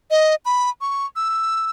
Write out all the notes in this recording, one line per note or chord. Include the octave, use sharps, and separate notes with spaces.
D#5
B5
C#6
E6